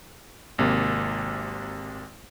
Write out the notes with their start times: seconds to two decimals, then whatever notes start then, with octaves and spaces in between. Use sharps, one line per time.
0.58 G#1 C3 A#3